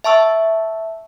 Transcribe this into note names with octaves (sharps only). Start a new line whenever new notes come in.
E5 A5 C#6 E6